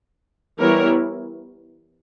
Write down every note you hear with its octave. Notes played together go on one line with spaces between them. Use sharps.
E3 G3 B3 E4 A#4 C#5